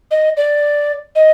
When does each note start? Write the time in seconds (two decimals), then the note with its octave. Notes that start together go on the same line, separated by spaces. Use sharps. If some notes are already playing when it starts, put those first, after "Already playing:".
0.11 D#5
0.36 D5
1.15 D#5